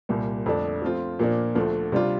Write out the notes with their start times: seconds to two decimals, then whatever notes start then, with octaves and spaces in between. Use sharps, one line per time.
0.09 C2 A#2 G3
0.46 F2 D3 A3 D4
0.82 F3 A3 C4 F4
1.19 A#2 F3 A#3 D4
1.55 D2 D3 F3 A3
1.92 C3 G3 D4 F4